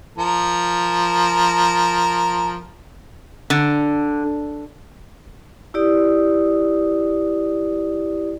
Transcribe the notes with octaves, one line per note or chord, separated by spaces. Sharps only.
F3 A#4
D3
E4 G4 D5 D#6